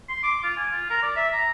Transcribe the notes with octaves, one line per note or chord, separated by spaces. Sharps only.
C6
D6
F4
G#5
F4
A#4
D5
E5
A#5